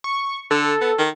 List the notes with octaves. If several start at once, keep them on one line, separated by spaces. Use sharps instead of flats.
C#6
D3 A4
B3
D#3